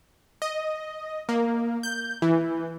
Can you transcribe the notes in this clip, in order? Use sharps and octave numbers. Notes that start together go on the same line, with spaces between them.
D#5
A#3
G6
E3